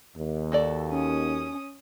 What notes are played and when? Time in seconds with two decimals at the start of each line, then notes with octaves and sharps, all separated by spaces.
0.17 D#2
0.52 F#4 A4 D5
0.90 C#4 D#6